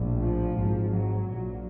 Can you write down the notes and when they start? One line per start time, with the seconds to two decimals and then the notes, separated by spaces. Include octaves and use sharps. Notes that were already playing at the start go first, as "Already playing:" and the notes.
Already playing: A#1 A2
0.21 F3
0.56 G#1 G#2
0.90 F#3
1.25 A#1 A#2